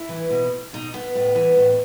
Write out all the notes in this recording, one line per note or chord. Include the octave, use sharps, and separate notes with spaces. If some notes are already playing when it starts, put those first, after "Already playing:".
Already playing: E4
E3
B2
B2 D#4
B3
A2
E3
A2